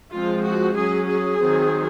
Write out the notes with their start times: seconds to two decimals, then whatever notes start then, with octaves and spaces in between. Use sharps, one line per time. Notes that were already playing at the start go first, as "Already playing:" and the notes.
0.12 F3 G#3 C4 F4
0.45 F#4
0.76 F#3 C#4 G#4
1.08 G#4
1.41 D#3 F#3 C4